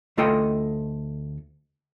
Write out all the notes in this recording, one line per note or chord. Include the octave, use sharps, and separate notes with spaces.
D2 A3 F4 A4 D#5 G5